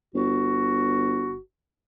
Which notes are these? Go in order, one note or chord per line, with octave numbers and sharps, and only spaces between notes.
G1 F#4